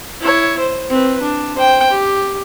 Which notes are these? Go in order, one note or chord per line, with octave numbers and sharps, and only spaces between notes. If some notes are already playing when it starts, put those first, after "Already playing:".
E4 C#5
C5
C4 B4
D4
C5 G5
G4